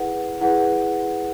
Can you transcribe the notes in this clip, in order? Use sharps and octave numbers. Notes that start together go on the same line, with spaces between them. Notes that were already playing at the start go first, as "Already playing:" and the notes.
Already playing: E4 G#4 B4 F#5
E4 G#4 B4 F#5